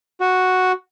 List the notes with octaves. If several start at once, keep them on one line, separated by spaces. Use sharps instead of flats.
F#4